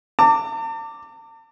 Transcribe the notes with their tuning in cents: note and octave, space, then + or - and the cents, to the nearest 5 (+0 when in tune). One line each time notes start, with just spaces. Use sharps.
A5 +45 D6 +0